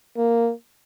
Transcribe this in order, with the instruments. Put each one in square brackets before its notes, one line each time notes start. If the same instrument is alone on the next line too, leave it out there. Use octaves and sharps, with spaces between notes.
[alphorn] A#3